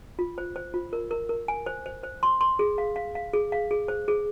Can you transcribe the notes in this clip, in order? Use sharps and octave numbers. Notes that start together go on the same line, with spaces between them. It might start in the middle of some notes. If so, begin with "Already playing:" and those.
F4
C5
C5
F4
A#4
A#4
A#4
G#5
C5
C5
C5
C6
C6
G#4
F5
F5
F5
G#4
F5
G#4
C5
G#4